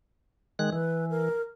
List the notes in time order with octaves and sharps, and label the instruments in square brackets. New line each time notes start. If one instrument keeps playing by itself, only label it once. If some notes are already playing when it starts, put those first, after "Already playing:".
[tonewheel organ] D#3 G#3 F#6
[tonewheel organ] E3 [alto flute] B4
[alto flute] A#4